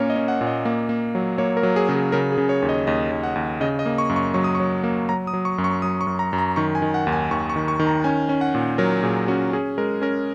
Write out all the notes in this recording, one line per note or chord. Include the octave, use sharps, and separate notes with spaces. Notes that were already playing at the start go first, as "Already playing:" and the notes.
Already playing: A#2 A#3 C#4 A#4 C#5
D#5
C#4
F#5
A#2
D#5
A#3
A#3
F#3
A#3 C#5
A#4
F#3
G#4
C#3
G#4
C#3 A#4
G#4
C#3
C#5
D#2
D#5
D#2 D#5
D#2
F#5
D#2
C#3 D#5
D#5
A#3
C#6
F#2
C#6
F#3 C#6
D#6
F#3 C#6
A#3
F#3 A#5
D#6
F#3
C#6
F#2
C#6
F#3 D#6
C#6
F#2
A#5
F#2
A#5
D#3 C#6
G#5
D#3
F#5
D#2
G#5
D#2 C#6
C#6
D#3
C#6
D#3
A#5
C#4 G#5
C#4
F#5
A#2
F#3 A#4
A#2 G#4
C#4 F#4
C#4 G#4
G#3 A#4
C#4 A#4